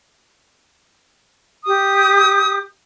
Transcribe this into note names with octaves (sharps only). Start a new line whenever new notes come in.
G4 D#6